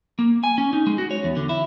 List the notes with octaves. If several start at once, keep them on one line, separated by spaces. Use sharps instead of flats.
A#3
G#5
C#4
D#4
G#3
F#4
C#5
E2
D3
E4